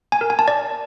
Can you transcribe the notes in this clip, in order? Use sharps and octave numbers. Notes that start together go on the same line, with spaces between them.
G#5
A#4
G#5
A5
D5